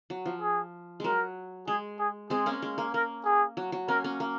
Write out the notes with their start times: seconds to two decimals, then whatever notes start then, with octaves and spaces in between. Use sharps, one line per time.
0.10 F#3
0.26 F3
0.41 G#4
1.00 F#3 G#3 A#4
1.67 G#3 G#4
1.99 G#4
2.30 G#3 C4 G#4
2.46 A#3 C#4
2.62 G#3
2.78 A#3
2.94 A#3 A#4
3.25 G#4
3.57 F#3
3.72 F#3
3.88 A#3 C#4 A#4
4.04 A#3 C#4
4.20 A#3